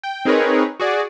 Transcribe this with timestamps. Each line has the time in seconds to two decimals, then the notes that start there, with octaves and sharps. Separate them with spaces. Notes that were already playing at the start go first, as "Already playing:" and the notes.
0.03 G5
0.25 C4 D#4 G#4 A#4 B4 C#5
0.80 F#4 G#4 D5